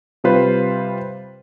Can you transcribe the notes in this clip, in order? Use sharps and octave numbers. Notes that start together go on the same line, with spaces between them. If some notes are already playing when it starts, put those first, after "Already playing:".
C3 G3 F4 B4 C5